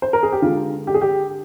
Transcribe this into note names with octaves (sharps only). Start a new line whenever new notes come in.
C5
A#4
G#4
G4
D3 G#3 F4
G4
G#4
G4